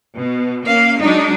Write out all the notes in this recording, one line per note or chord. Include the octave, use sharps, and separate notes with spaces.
B2
A#3 C#4 F5
F#3 G#3 D4 D#4